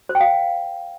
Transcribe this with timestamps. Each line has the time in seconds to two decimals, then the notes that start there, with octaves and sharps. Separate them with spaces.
0.09 C5
0.15 G5
0.21 F5